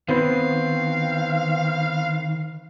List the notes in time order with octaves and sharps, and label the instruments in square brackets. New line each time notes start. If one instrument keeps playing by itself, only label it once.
[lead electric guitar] D#3 [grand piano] B3 C4 [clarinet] F5